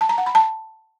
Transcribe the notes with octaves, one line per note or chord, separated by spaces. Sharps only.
A5
A#5
F#5
B5
A5